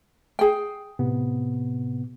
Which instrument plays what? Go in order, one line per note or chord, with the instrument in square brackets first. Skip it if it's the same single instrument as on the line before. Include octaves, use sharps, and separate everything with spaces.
[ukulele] G#4 G5
[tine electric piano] A2 C3 B3